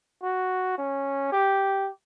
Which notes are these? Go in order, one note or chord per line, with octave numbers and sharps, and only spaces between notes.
F#4
C#4
G4